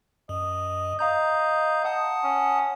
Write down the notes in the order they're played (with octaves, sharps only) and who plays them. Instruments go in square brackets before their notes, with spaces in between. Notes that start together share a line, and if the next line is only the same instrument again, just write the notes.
[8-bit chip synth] F#2 [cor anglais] D#5
[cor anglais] D#5 [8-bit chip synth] F5 A#5 G6
[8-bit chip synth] F#5 A5 D#6
[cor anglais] C#4